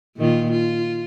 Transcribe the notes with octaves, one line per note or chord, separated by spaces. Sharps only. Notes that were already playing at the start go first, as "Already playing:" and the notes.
A#2 D#3 F4
F4